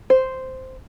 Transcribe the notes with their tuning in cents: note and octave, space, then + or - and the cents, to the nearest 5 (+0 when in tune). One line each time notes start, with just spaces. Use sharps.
C5 -5